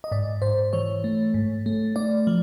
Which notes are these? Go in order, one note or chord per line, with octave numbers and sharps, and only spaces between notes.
D#5
G#2 D5
G#2 C5
E3 C#5
A3
G#2
A3
A3 D5
F3